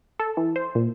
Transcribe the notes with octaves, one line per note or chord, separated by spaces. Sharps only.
A4
E3
C5
A#2